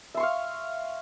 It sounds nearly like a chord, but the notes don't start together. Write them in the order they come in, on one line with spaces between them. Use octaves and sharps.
E5 C6 C#6 F5